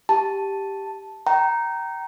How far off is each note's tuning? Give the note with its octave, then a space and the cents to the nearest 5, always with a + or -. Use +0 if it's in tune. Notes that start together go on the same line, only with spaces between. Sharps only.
G4 +0 A5 +0
G5 -30 A#5 +0